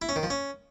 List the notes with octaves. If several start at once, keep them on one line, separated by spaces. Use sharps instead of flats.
E4
C#4
D#3
F3
C#4